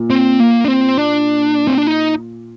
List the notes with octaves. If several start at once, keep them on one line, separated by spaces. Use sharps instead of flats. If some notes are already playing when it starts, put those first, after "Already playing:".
Already playing: A#2
C4
A#3
D4
C4
D4
C4
D4
D#4